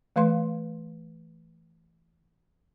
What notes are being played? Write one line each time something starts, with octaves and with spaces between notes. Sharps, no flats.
E3 A3 B4 F5 C6